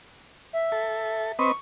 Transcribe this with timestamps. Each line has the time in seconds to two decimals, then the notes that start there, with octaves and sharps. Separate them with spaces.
0.53 E5
0.72 A4
1.39 C4 B4 D#5 C#6